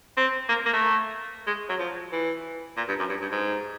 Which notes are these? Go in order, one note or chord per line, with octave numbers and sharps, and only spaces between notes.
C4
A#3
A#3
A3
G#3
F#3
F3
E3
A#2
G2
F#2
G2
G2
G#2